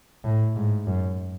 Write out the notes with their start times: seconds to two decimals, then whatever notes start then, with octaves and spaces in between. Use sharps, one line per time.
0.24 A2
0.56 G#2
0.87 F#2